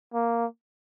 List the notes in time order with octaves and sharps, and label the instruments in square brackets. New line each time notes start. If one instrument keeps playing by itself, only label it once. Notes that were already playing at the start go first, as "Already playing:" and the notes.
[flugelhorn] A#3